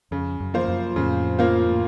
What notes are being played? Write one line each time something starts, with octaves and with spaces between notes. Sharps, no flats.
F2 C#3
F#2
F3 A#3 F4 C5
F#2
F2 A2 C#3
F3 A#3 F4 C5
A2